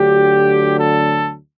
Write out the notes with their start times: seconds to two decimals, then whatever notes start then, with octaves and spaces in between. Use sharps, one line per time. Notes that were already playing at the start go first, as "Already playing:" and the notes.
Already playing: D2 D3 F#3 G4
0.79 A4